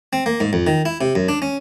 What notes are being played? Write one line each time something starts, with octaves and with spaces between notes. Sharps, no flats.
C4
A#3
G#2
F2
D#3
E4
C3
F#2
D4
C#4